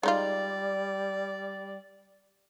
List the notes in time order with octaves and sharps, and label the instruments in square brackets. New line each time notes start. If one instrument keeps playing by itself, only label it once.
[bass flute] G3 [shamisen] G#3 D#4 F4 [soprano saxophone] D5